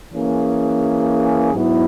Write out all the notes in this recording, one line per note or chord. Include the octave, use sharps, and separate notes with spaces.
E3 A#3 C#4 G#4
G#2 F#3 B3 E4